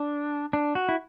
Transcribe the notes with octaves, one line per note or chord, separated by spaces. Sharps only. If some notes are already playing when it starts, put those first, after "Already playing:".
Already playing: D4
D4
F#4
E4